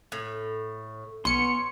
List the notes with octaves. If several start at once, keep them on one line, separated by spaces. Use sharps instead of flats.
A2
B1 B3 C#4 C6 C#7